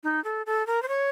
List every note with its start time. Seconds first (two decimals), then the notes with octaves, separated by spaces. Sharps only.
0.04 D#4
0.24 A4
0.46 A4
0.67 A#4
0.82 C5
0.88 C#5